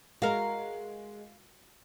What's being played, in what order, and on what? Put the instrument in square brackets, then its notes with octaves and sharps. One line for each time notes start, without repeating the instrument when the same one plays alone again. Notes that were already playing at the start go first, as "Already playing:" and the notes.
[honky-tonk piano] G#3 [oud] F#4 A#4 [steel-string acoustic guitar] F5